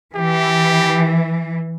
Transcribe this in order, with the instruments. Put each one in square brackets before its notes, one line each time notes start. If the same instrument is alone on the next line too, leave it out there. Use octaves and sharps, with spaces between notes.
[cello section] E3 [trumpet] G4